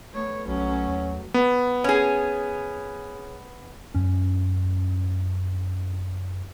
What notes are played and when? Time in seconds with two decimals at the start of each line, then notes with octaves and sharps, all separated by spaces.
0.14 A3 B3 C#5
0.48 B1 G2 F#3 C#4
0.88 D#2
1.34 B3
1.84 C#4 G#4
3.94 F#2 C#4